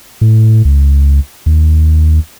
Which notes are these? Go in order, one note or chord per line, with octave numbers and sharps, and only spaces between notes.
A2
C#2
D#2